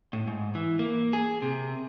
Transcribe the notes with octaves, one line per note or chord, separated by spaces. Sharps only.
A2
G#2
E3
A#3
G#4
C3